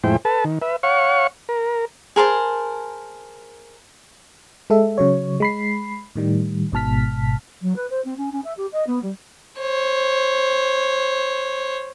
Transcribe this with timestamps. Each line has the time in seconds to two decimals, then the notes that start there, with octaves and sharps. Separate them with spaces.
0.04 F2 A2 G#3 E4 C5 G5
0.25 A4 B4 A5
0.45 D#3
0.62 B4 E5
0.83 C#5 F5 F#5 C#6
1.49 A#4
2.16 G#4 A#4 C5 A5
4.70 G#3 A4 E5
4.98 C#3 F#3 C#5
5.40 G#3 B5 C7
6.15 A2 D#3 G3
6.72 G#1 G#2 B2 A5 F6 B6
7.62 F#3
7.76 B4
7.90 C5
8.05 C4
8.17 C#4
8.32 C#4
8.44 E5
8.57 G4
8.72 D#5
8.87 B3
9.02 G3
9.59 C5 C#5